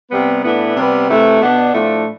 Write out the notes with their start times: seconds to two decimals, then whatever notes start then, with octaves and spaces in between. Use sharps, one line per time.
0.10 C3 G3 B3
0.43 A2 E3 B3 D4
0.76 C3 G3 B3
1.08 C3 E3 A3
1.41 B2 B3 D4
1.74 A2 F3 A3 D4